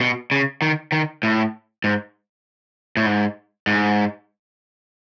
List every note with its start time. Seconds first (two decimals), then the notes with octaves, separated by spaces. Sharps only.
0.01 B2
0.31 C#3
0.62 D#3
0.92 D#3
1.23 A2
1.84 G#2
2.97 A2
3.06 G#2
3.67 G#2